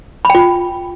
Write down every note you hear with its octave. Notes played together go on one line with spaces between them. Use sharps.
F4 G5 B5